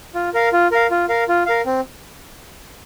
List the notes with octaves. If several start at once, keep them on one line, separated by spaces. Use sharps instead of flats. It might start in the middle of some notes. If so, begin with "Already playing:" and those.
F4
A#4 F5
F4
A#4 F5
F4
A#4 F5
F4
A#4 F5
C4